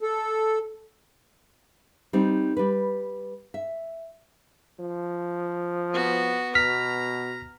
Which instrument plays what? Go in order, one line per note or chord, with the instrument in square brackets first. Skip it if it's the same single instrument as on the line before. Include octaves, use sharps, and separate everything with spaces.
[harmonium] A4
[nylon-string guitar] G3 C4 D#4
G3 B4
E5
[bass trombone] F3
[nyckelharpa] B3 F#4
[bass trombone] B2 [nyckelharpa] A#5 [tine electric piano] F6 B6